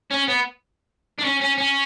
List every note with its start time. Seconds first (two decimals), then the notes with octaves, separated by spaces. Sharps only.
0.11 C#4
0.28 B3
1.19 D4
1.25 C#4
1.41 C#4
1.58 C#4